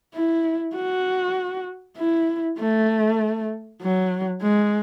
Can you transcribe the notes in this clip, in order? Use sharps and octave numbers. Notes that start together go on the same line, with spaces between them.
E4
F#4
E4
A3
F#3
G#3